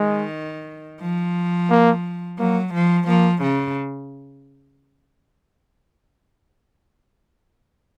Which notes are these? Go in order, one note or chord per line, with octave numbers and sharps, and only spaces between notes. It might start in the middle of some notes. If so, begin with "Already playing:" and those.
Already playing: D#3 G#3
F3
A#3
F#3 A#3
F3
F3 A#3
C#3